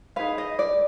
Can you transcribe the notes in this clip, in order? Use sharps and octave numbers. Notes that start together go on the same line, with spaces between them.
D#4 G#4 B4 F5
D#5
D5